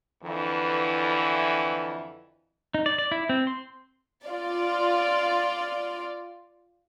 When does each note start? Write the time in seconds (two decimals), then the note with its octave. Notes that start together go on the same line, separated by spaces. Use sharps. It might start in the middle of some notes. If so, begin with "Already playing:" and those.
0.23 F2 D3 E3
2.74 D#4
2.86 D5
2.98 D5
3.11 E4
3.29 C4
3.47 C6
4.26 F4 D5